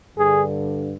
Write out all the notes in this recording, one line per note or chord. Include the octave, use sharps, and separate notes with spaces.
G2 D3 G#4